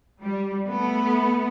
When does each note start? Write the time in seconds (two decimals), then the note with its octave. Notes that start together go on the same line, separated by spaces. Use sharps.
0.22 G3
0.66 A3 B3